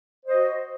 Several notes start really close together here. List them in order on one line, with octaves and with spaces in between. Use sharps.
C5 D#5 F#4